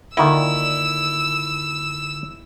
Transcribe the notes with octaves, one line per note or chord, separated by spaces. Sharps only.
A#2 D3 D#3 E4 D5 E6